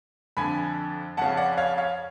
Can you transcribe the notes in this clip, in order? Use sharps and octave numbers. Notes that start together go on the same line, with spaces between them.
F2 D3 G#5 B5
F2 C#3 F#5 A5
D5 F#5
C#5 F5
C#5 F5